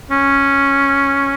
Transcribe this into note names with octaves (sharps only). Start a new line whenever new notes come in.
C#4